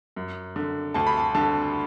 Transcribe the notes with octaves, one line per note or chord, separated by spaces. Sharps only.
F#2
D3
D2 A5
B5
A5
D3 A5